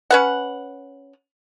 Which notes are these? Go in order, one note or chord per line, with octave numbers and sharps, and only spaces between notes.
C#4 B4 F#5